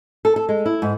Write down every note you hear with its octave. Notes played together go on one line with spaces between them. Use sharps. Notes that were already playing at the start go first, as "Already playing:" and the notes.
A4
A4
G#3
E4
G#2